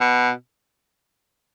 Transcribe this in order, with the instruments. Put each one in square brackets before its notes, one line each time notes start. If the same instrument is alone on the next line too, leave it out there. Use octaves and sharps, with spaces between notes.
[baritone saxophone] B2